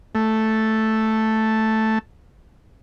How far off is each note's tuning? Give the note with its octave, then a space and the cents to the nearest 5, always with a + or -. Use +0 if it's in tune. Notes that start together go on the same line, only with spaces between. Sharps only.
A3 +0 A4 +0